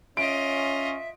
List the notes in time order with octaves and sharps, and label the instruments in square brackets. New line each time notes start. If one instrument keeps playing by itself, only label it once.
[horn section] C#4 [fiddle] F4 D#5 [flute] E5 [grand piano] D7